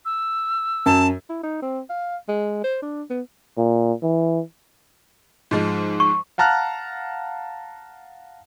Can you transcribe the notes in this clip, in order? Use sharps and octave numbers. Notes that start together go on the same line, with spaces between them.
E6
F#2 A5
E4
D#4
C4
F5
G#3
C5
D4
B3
A#2
E3
G#2 F3 G#3
C#6
F5 F#5 A5 A#5 F6 F#6